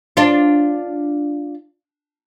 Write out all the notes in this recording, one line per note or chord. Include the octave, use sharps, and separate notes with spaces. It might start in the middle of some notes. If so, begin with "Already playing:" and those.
D4 F4